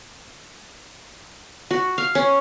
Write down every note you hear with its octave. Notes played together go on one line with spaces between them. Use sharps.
F#4
F5
C#4